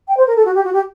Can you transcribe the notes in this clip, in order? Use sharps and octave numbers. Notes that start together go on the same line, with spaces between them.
G5
C5
A#4
A4
F#4
G4
F#4
G4